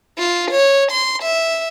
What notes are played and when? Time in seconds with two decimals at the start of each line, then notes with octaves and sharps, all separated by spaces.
0.18 F4
0.51 C#5
0.92 C6
1.22 E5